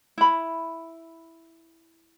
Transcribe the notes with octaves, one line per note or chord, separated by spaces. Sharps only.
E4 B5